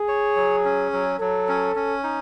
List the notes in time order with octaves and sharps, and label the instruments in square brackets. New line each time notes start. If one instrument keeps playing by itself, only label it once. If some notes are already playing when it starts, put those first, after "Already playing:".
Already playing: [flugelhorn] G#4
[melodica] C#5
F#3
C#4
F#3
[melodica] F#3 [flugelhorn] A4
[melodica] C#4
C#4
D#4